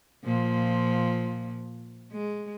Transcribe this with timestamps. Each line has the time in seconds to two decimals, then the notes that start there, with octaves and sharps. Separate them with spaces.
0.25 A#2 F3
2.12 G#3